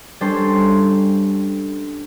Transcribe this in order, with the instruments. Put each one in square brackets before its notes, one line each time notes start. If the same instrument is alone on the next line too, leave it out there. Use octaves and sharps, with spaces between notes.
[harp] G3 C#4 D4 A4 C5